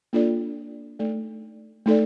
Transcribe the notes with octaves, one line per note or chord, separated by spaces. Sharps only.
A#3 D4 F4 A4 D5
A3 D#4 A4 D5
A3 D#4 A4 D5